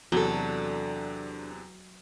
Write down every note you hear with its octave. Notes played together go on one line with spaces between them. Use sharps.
E2 C3 F#3 D4 A4